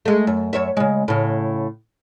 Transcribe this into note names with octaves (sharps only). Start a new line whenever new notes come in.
G#3 A3
F#2
F#2 C#5 E5
C#3 G#3
A2 C#3